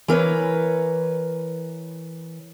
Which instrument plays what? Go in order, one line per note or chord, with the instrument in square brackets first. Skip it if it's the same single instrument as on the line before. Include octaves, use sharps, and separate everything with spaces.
[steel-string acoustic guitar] E3 A#4 B4 C#5